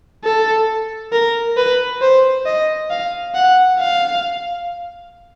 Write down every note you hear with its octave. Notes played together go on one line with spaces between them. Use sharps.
A4
A#4
B4
C5
D#5
F5
F#5
F5